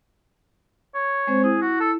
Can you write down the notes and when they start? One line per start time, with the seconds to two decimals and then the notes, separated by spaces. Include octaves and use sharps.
0.95 C#5
1.27 G#3 C4 C5
1.44 E4 G#4
1.62 F#4
1.81 A4